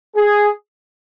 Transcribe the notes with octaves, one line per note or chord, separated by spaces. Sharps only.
G#4